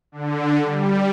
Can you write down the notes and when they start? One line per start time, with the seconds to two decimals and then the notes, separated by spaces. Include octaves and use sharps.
0.12 D3
0.62 G3